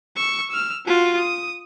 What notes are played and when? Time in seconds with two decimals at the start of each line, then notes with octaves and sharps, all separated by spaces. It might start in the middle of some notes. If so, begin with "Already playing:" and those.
0.16 C#6 E6
0.50 E6 F6
0.85 F4 F#4
1.17 D#6